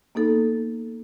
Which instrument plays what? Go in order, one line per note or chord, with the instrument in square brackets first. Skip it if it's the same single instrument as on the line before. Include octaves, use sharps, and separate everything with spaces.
[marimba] A#3 B3 D#4 A4